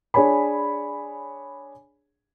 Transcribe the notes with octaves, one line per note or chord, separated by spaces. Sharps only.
D4 G#4 C#5 G#5 B5